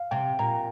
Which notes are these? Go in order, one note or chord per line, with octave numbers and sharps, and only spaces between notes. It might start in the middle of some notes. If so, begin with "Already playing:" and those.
Already playing: F5
C3 G5
A#2 A#5